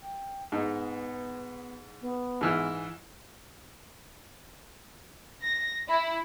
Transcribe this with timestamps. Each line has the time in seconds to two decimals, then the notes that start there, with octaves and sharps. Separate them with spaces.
0.01 G5
0.52 G#2 B3 D#4
2.01 B3
2.41 G#2 E3 F6
5.43 A#6
5.88 E4